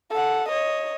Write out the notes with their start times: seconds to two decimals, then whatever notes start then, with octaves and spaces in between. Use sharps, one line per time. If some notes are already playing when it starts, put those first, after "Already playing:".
0.11 A4 F#5
0.48 C#5 D#5